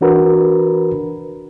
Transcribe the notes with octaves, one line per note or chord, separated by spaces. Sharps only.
E3 D4 F#4 A#4 B4